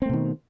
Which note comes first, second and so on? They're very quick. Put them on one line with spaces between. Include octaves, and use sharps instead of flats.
C4 A3 B2 D#3